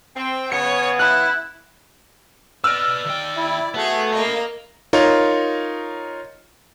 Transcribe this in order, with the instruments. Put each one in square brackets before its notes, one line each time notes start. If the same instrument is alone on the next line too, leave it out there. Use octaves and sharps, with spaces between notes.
[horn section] C4 [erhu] G5
[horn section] C#3 B3 [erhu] C#5 [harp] C#7
[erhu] E4 [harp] F#6
[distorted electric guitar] B4 D#5 [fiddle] D5 [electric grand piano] E6 F6 D7
[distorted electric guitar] D#2 G5
[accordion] E4
[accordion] A3 [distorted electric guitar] B3 [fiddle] F#4 G#4
[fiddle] A#3 D#5 [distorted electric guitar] F5 B5
[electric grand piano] D#4 F4 A#4 C#5